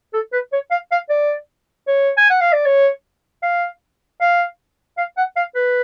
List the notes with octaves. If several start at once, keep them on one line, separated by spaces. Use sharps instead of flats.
A4
B4
C#5
F5
F5
D5
C#5
G#5
F#5
F5
D5
C#5
F5
F5
F5
F#5
F5
B4